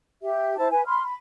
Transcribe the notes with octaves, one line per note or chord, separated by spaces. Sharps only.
G4 E5
E4 C5 A5
B4 G#5
B5 C6 F6
B5